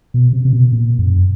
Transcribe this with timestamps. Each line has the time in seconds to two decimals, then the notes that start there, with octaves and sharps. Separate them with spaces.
0.14 B2
0.32 C3
0.45 C3
0.53 B2
0.73 A#2
0.99 F#2